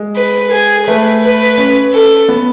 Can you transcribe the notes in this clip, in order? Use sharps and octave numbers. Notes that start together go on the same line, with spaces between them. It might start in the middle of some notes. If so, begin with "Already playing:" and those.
Already playing: G#3
B4
G#4
A3 B4
B4
C#4
A4
B3